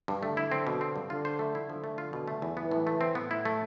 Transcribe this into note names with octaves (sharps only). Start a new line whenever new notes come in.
G2
D3 A3
E4
C4
B2
C4
G2
D3 F4
C5
A3
E4
D3 F3
A3
F4
B2
A3
E2
E3 B3
A2
A3
C4
A2 B3
E4
A3